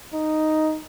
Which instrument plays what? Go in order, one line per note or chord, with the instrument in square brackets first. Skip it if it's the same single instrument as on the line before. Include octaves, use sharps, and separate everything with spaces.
[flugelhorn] D#4